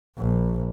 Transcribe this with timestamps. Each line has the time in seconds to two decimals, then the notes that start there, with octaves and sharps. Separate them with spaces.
0.18 A#1